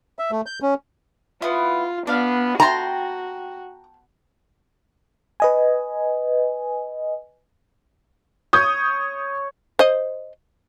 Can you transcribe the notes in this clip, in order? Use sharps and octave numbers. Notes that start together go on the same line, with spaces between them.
E5
A3
G6
C#4
B3 E4 F4
B3 D4 F5
F#4 G5 A5 A#5 C6
B4 D#5 G#5
C#5 D#6 G6
C5 D#5